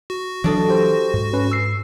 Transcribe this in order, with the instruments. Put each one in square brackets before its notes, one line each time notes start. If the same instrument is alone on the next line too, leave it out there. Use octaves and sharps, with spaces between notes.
[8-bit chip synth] F#4
[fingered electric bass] E3 F#3 [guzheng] D4 A4 D#5
[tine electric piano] G4 C5
[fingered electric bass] G#2
[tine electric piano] C#4 B4
E6 C7